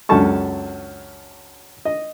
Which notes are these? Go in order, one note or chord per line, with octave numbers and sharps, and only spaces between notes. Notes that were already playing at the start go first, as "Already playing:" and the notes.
C#2 F#2 D4 A4 A5 C#6
D#5